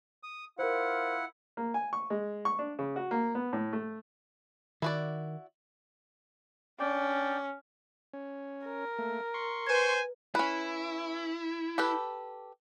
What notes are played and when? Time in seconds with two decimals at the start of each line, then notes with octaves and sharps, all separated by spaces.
0.23 D#6
0.59 E4 F4 A#4 C5 F#5
1.57 A#3
1.74 G#5
1.93 C#6
2.10 G#3
2.45 C#6
2.59 D4
2.79 C#3
2.96 F#4
3.11 A#3
3.35 B3
3.53 A2
3.73 A3
4.82 D#3 E4 F#4 D5
6.80 C#4 D4 D5 G5
8.13 C#4
8.66 A#4
8.99 A3 A#3
9.34 C6 C#6
9.66 B4 C5 G#5 G#6
10.35 C#4 E4 B4
11.78 G4 A4 B4